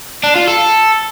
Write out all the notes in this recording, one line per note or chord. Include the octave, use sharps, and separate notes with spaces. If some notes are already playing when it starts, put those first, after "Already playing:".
D4
F4
A4